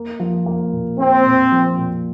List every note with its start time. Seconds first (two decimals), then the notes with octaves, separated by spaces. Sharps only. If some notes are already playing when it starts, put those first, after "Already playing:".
Already playing: A#3
0.20 F3
0.46 A#3
0.73 A#2
0.99 A#3 C4
1.26 A#2
1.52 F3
1.78 A#2